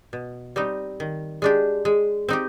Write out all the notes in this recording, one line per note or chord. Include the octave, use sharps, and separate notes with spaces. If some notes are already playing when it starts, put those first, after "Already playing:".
B2
G3 C4 D#4
D#3
G#3 D4 G4
G#3
C4 D#4 G4